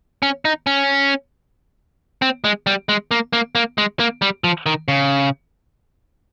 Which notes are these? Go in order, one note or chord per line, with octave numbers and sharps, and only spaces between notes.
C#4
D#4
C#4
C4
G#3
G3
G#3
A#3
A#3
A#3
G#3
A#3
G3
F3
D#3
C#3